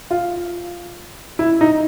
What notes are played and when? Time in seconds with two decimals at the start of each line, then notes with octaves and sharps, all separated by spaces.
0.11 F4
1.39 E4
1.61 D#4